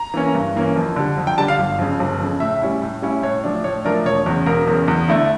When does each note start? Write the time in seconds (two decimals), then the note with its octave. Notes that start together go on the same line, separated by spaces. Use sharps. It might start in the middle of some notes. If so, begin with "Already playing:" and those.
Already playing: A#5
0.14 E3 A#3 C#4
0.35 G2
0.56 E3 A#3 C#4
0.76 F2
0.96 D3 G3
1.17 F2
1.27 G5
1.38 D3 G3 A5
1.48 F5
1.59 G1
1.79 F2 C#3
2.00 G1
2.20 F2 C#3
2.40 A2 E5
2.62 G3 C#4 E4
2.82 A2
3.02 G3 C#4 E4
3.23 A2 C#5
3.44 F3 A3 D4
3.64 A2 C#5
3.84 F3 A3 D4 A#4
4.05 E1 C#5
4.26 E2 C#3
4.46 E1 A#4
4.67 E2 C#3
4.88 E2
5.08 D3 A3 E4